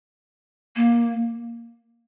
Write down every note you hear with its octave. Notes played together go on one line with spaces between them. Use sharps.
A#3